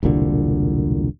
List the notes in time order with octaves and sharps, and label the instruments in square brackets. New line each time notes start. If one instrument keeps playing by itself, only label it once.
[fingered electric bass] E1 C2 A#2 D3